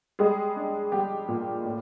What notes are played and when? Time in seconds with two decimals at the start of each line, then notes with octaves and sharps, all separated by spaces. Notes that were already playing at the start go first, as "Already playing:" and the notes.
0.19 G3 G#3 G#4
0.56 D4
0.92 G3 G4
1.28 A#2
1.65 A2